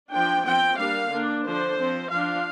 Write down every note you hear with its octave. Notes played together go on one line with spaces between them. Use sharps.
F3 D4 G5
F3 C4 G5
G3 A#3 D4 F5
D3 A#3 D4
D3 F3 D4 C5
F3 C4
F3 D4 F5